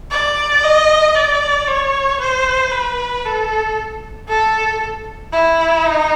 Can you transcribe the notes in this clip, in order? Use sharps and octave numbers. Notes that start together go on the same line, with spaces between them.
D5
D#5
D5
C#5
C5
B4
A4
A4
E4
D#4